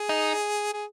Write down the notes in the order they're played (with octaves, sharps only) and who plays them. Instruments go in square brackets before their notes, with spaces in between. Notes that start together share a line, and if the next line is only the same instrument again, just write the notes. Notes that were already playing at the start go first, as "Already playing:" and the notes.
Already playing: [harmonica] G#4
[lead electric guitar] D#4
[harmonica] G#4